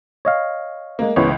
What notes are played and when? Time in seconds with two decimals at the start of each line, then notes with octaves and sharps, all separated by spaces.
0.25 C#5 D#5 F5
0.99 G#3 A#3
1.16 C#2 E3 B3 C#5